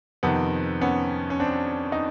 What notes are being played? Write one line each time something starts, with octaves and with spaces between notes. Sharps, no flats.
F2 C3 D#3 B3
B3 C#4
C#4
C4 D4
D#4